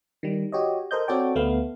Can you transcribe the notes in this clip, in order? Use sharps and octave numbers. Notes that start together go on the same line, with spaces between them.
D#3 G3
F#4 G4 C#5 D#5
A4 A#4 C5 D#5 G6
C4 F#4 A4 C#5 D5 G5
D2 A3 B3 F5